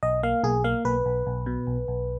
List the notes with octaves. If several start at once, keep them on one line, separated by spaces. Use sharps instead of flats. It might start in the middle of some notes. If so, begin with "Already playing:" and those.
B1 D#5
A#3 F5
B1 G#4
A#3 F5
B1 B4
B1
B1
B2
B1
B1